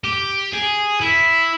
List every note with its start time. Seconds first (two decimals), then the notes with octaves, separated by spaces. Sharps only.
0.04 G4
0.53 G#4
1.01 E4